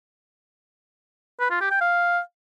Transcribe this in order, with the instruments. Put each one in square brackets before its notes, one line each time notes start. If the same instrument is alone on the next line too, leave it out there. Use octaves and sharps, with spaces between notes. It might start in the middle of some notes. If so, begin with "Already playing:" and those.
[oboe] B4
F4
G4
G5
F5